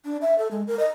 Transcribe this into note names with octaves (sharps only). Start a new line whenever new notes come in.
D4
E5
A4
G#3
A#4
D#5